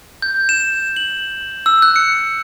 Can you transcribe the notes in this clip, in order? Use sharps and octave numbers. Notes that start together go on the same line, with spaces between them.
G6
E7
F#7
E6
F#6
C#7